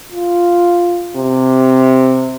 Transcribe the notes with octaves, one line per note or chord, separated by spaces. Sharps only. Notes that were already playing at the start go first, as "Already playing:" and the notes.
F4
C3